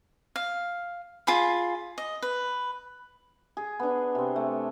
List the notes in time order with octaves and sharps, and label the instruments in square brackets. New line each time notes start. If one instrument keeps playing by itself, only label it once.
[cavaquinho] F5
F4 G#4 B5
D#5
B4
[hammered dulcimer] G#4
B3 D4
C3 C4
A3